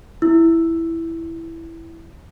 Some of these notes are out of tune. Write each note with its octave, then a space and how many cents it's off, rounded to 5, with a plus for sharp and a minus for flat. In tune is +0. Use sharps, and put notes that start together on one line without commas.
E4 +0 E6 +5